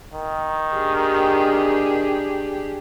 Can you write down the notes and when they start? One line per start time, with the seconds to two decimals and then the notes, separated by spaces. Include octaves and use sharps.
0.13 D#3
0.75 D4 G4 G#4